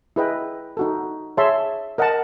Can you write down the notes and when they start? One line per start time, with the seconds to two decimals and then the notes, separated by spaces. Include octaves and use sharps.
0.16 E4 G#4 B4 D#5 G5
0.77 D#4 F#4 A4
1.37 G#4 C#5 E5 A5 C6
1.98 A#4 D#5 F#5 A5